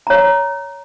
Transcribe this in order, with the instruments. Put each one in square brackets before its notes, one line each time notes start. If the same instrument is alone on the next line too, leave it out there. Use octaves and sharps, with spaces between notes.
[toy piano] C#5 A#5